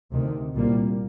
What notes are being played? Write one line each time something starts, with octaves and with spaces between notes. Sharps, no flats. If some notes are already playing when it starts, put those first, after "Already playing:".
D2 C3 D#3
C2 A#2 G3 A#3